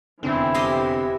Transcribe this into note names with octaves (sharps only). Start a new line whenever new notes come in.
F1 E2 D3 E3 C4 E4
G4 D#5 C6